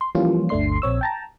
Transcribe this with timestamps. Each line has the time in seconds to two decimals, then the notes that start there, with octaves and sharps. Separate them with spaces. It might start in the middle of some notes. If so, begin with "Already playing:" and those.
0.01 C6
0.15 E3 F3 G3 A#3 C#4 F4
0.49 G1 D2 A3 D4 C6 C7
0.82 A#1 C4 C#5 E6
1.01 G5 A5 A#5